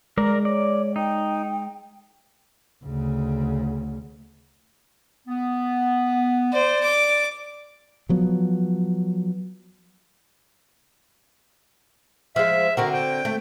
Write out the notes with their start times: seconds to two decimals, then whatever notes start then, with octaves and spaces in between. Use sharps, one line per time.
0.18 G#3 A#4 D5 A#5
0.45 C#5 D5
0.96 D#4 G5
2.84 D2 C#3
5.28 B3
6.53 C5 D5
6.83 D6
8.09 F3 F#3 B3
12.36 F3 G#3 E5
12.77 D3 C4 F#4 A#4
12.93 G5
13.25 A3